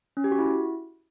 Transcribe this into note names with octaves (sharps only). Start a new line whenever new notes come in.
C#4
G4
F#4
E4